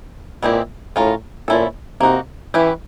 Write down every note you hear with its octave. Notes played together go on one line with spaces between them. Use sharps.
A#2 E3 G#3 C4 E4 G4
A2 C#4 F4 A#4
A#2 F3 A3 C#4 E4 A4
C3 A#3 D#4 F#4
E3 C#4 E4 G4 B4